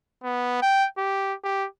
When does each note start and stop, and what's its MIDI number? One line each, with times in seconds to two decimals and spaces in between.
0.23 0.57 59
0.62 0.86 79
0.98 1.34 67
1.44 1.66 67